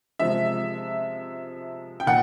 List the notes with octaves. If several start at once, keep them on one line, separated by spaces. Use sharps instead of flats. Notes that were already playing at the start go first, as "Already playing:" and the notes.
C3 F3 G#3 E5
G5
A#2 F#5